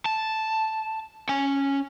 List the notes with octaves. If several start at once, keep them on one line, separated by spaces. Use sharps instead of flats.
A5
C#4 G#5